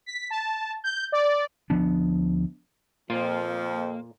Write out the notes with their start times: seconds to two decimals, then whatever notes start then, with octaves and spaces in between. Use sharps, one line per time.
0.06 B6
0.30 A5
0.84 G6
1.12 D5
1.70 D2 F3 B3 D4
3.10 F2 A#2 F3 A#3 F4